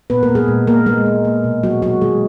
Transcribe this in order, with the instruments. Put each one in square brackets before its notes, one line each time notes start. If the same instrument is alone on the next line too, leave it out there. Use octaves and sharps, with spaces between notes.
[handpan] A#2 B3 B4
A#3 A#4
A#2
G#3 G#4
A#2
A#2 A#3 A#4
G#3 A#3 G#4
A#3
A#3
B2
F#3 F#4
A#2 F#3 F#4
D3 G#3 G#4